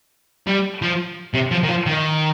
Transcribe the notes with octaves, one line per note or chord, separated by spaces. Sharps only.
G3
F3
C3
F3
D#3
F3
D#3